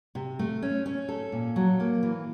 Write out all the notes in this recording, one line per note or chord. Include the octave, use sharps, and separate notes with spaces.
C3
A3
C#4
C#4
A4
A#2
F#3
A#3
E3